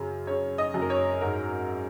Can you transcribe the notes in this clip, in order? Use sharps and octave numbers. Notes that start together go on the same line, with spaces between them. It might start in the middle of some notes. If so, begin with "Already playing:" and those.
Already playing: F#2 C#3
C#3 C#5
D#5
F#2
A#4
C#5
G#2 A#4